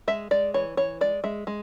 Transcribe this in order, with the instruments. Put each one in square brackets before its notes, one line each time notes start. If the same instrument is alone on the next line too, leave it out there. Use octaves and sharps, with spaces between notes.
[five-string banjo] G#3 E5
G#3 D5
E3 C#5
E3 C#5
G#3 D5
G#3 E5
G#3